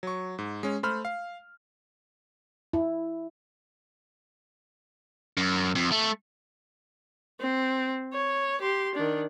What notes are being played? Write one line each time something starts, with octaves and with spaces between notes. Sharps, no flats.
F#3 C#6
G#2
G#3 C#4
A3 C5 B5 F6
F5
E4
F#2
F2
A3
C4
C#5
G4 C6
D#3 D4